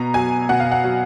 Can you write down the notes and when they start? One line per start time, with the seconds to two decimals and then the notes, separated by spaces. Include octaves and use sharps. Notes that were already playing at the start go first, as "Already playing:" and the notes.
Already playing: B2 A#5
0.14 F#3 G#5
0.49 B2 F#5
0.60 F5
0.71 F#5
0.84 F#3